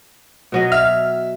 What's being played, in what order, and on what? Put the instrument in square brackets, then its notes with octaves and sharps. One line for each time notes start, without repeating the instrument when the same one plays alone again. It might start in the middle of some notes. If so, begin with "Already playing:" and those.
[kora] B2 F#3 D#5
[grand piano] E5 [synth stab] F6